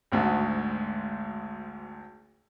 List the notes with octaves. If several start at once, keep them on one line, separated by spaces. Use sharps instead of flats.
G#1 D2 G#2 F#4